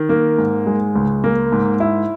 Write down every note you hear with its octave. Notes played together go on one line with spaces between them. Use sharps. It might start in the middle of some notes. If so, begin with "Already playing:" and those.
Already playing: D#3
A#3
G#2
G#3
C#2
A#3
G#2
E4